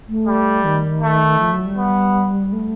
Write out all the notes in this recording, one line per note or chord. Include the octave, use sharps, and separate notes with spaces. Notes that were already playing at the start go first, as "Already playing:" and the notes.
A3
G3
D#3
A3
F3
F#3
G3
B3
A3